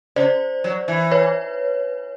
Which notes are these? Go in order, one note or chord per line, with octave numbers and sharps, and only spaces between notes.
C#3 C5 D5
F#3
E3
B4 C#5